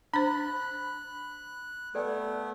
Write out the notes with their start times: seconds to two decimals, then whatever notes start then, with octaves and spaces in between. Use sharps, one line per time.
0.14 D4 C5 B5 F#6
1.95 A3 B3 A4 D5 G5